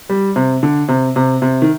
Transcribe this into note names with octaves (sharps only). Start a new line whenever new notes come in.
G3
C3
D3
C3
C3
C3
D#3